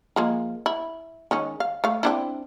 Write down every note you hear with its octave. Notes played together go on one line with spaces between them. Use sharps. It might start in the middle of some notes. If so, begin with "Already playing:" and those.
F3 G#3 A#3
E4
D#3 G#3 C#4
F5
A3 F5
C4 D4 E4